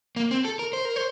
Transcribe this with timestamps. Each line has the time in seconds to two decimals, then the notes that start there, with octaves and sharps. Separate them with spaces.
0.16 A#3
0.31 C4
0.45 A4
0.59 A#4
0.73 C5
0.85 A#4
0.96 C5